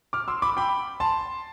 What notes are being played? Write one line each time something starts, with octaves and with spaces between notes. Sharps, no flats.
D6 F6
C6 E6
B5 D6
G5 B5
A5 C6